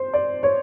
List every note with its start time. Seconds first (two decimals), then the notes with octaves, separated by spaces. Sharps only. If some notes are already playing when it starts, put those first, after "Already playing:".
Already playing: C5
0.14 D5
0.43 C#5